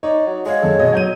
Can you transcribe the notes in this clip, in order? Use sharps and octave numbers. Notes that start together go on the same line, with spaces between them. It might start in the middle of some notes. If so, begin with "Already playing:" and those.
D#4 C#5 D5
F#3
G#3 G#4 C#5 F5 F#5
F#2 A4
B2 D#5
F#3 G6 D#7